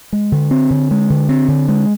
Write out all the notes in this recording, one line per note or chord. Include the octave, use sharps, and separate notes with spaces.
G#3
D3
C4
D3
G#3
D3
C4
D3
G#3